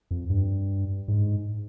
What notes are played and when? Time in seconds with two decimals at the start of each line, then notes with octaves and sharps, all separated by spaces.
0.11 F2
0.30 G2
1.08 G#2